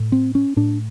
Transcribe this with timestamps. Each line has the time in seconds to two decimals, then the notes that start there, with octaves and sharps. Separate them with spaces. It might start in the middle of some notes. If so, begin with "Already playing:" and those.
Already playing: A2
0.12 C4
0.35 C#4
0.56 A2 D4